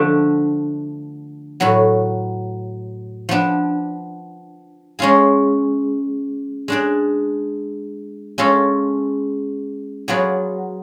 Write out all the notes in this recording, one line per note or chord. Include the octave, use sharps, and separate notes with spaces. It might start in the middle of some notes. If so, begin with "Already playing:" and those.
Already playing: D3 F3 A3 D4
A2 F#3 B3
F3 B3 D4
G#3 C#4 F4 G#4
G#3 D4 G#4 D5
G#3 C#4 F4 A4
F#3 B3 F4 G#4 D5